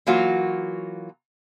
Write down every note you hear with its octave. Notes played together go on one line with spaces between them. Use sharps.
E3 F#3 A#3 F4 F#4